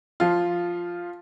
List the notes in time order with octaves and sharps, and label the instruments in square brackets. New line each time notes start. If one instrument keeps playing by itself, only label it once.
[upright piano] F3 F4